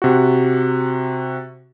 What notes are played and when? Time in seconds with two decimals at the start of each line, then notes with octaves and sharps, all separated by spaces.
0.02 C3 F#4